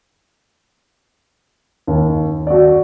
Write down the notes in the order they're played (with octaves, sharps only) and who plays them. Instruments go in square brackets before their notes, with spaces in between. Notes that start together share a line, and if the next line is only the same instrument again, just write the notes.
[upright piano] D#2
F#4 D5